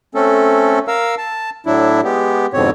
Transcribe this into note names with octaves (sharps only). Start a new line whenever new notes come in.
A3 C4 C#4 A4
A#4 F5 E6
A5
A2 F#3 D4 E4
G#3 B3 G4
F2 G#2 B2 D3 C4 C#5